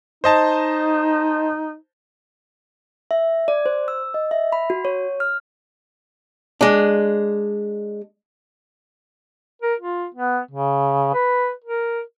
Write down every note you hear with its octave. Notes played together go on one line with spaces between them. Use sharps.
D#4 C5 D#5 A5
E5
D5
C5
E6
D#5
E5
B5
F#4
C#5
F6
G#3 D4
A#4
F4
B3
C#3
B4
A#4